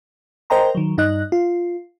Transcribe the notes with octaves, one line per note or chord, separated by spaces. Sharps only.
A#4 C5 D#5 G5 A#5 C6
D#3 F#3
G2 D#4 D#5 F#6
F4